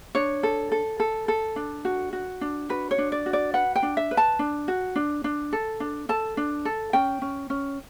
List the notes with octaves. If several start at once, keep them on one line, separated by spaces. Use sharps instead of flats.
D4 C#5
A4
A4
A4
A4
D4
F#4
F#4
D4
F#4 B4
C#5
D4
D5
F#4
D5
B4 F#5
G5
D4
E5
B4
A5
D4
F#4
D4
D4
A4
D4
A4 A5
D4
A4
C#4 G5
C#4
C#4